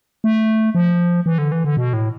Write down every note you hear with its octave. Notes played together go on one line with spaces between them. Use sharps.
A3
F3
E3
D3
E3
D3
B2
A2